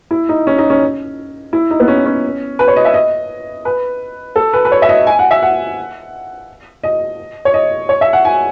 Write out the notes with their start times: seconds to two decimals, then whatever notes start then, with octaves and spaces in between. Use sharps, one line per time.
0.11 E4
0.29 D#4
0.47 C#4
0.58 D#4
0.70 C#4
1.53 E4
1.71 D#4
1.80 B3
1.88 C#4
2.06 C#4
2.59 B4
2.68 C#5
2.76 D#5
2.85 E5
2.94 D#5
3.65 B4
4.36 A4
4.53 B4
4.65 B4
4.72 C#5
4.82 E5
4.89 D#5
5.07 G#5
5.19 F#5
5.31 E5
5.42 F#5
6.84 D#5
7.45 C#5
7.54 D#5
7.89 C#5
8.01 E5
8.13 F#5
8.25 G#5